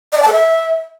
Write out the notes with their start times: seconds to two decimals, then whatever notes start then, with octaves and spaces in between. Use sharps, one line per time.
0.12 D#5
0.17 D5
0.22 A5
0.27 A4
0.32 E5